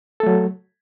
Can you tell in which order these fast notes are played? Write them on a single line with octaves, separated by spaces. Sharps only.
A4 A3 F#3